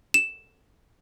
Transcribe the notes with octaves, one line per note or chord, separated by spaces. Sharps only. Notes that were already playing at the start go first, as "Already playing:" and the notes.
E7